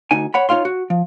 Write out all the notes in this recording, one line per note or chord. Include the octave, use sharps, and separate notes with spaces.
D2 D#4 G#5
C#5 F#5 B5
D#4 F4 C#5 F5 C6
F#4
F3